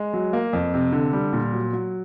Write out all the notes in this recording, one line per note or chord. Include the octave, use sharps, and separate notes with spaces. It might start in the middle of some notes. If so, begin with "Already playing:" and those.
Already playing: G#3
F#3
A#3
F2
C3
D3
G3
A#2
F#3
F#3